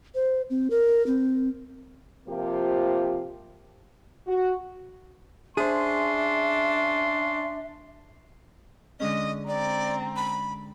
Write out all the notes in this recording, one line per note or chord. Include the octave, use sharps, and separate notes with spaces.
C5
C4
A#4
C4
C3 F3 A#3 F4 G4
F#4
C#4 D4 G#4 C5 E5 C6
D3 G#3 C#4 D#5
C4 D5 A#5
B5